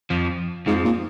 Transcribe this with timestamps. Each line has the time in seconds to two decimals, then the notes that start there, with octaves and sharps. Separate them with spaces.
0.10 F2 F3
0.66 F2 G#2 F3
0.85 A#2